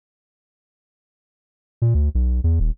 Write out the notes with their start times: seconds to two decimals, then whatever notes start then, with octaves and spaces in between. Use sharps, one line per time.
1.82 A#2
1.94 D2
2.15 B1
2.44 E2
2.60 D#1